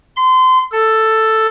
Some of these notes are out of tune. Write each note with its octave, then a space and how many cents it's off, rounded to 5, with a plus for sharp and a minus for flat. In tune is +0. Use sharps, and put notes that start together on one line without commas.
C6 -25
A4 +5